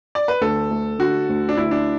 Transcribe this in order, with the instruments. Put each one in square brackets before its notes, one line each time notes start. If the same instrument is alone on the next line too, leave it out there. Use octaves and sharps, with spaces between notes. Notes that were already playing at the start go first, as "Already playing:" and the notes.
[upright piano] D5
B4
[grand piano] D2 [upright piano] A4
[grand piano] A3
[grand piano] D3 [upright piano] F#4
[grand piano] D2
[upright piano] D4
[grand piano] D2 [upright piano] E4
[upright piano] D4